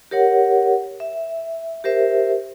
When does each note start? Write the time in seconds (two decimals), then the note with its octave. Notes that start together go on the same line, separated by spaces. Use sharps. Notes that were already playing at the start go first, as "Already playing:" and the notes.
0.11 G4 A#4 C#5 F#5
1.00 E5
1.84 G4 A#4 C5 E5